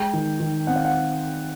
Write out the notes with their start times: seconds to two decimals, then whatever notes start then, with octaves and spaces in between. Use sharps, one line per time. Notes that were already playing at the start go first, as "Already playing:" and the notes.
Already playing: G#3 G5
0.13 D#3
0.40 D#3
0.67 C4 F#5
0.76 F5
0.85 F#5